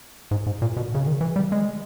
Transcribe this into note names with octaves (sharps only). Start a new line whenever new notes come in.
G#2
G#2
A#2
B2
C#3
D#3
E3
G3
G#3